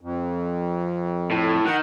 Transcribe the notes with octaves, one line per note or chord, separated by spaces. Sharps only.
F2
A2
D#3 F#5